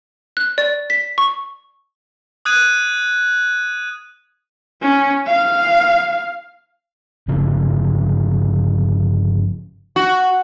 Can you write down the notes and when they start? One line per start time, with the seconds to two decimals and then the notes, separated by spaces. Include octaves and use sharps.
0.37 F#6
0.58 D5
0.90 B6
1.18 C#6
2.45 D#6 F#6 G#6 D#7
4.82 C#4
5.27 F5
7.28 G1 C#3 F3
9.96 F#4